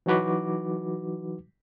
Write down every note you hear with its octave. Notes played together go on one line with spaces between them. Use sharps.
E3 F#3 D#4 F#4 B4 D6